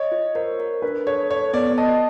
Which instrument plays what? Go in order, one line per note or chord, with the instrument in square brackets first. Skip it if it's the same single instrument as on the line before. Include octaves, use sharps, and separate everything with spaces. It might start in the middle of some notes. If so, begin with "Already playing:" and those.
Already playing: [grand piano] C#5 [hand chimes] D#5
[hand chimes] F4
[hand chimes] A#4 [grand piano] C5
[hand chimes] A#4
[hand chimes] D4 [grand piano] B4
[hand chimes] A4 [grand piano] C#5
[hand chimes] A4 [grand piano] C#5
[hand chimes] B3 [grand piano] D5
[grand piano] D5
[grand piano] D#5 [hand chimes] A5